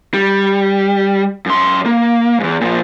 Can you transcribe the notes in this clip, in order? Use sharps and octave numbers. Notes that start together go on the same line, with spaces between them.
G3
F#2 C6
A#3
E2 G#2
A#2 F3